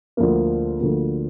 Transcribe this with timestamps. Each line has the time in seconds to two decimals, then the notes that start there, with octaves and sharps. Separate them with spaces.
0.17 D2 D3 F3 A#3
0.80 D2 D3 F3 A#3